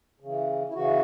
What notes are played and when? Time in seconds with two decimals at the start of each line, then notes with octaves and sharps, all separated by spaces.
0.20 C#3
0.25 E3
0.69 E4
0.73 C#3 E3 F#4